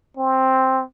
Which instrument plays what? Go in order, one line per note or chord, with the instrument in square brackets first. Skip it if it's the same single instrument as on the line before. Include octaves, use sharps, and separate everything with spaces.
[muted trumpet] C4